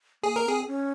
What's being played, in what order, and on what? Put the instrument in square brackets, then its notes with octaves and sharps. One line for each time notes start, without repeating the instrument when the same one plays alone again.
[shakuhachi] A#3 [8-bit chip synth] G#4
[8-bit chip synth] A#4
[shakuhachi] C4 [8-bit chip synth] G#4
[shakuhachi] C#4